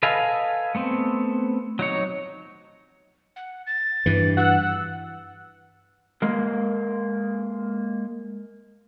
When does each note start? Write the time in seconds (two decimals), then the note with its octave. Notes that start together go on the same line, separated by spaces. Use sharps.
0.03 A4 B4 D#5 F5 G#5
0.75 A3 B3 C4
1.79 F#3 D#4 C#5
3.36 F#5
3.67 A6
4.06 G2 E3
4.37 F#5 E6
6.22 G#3 A#3 A#4